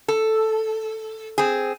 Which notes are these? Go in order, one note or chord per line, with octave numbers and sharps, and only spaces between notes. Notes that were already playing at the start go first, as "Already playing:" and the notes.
A4
C4 G#4